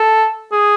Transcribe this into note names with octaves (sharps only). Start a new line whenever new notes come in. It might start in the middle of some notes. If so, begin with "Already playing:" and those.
Already playing: A4
G#4